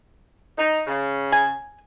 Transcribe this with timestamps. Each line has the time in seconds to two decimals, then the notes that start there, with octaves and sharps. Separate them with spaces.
0.57 D#4
0.87 C#3
1.32 G#5